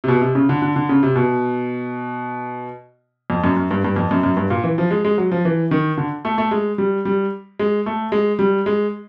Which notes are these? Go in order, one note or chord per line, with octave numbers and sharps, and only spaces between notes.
C3
B2
C3
C#3
D3
D3
D3
C#3
C3
B2
F2
F#2
F#2
G2
G2
F2
F#2
F#2
G2
A#2
E3
F3
G#3
G#3
F#3
F3
E3
D#3
D3
A3
A3
G#3
G3
G3
G#3
A3
G#3
G3
G#3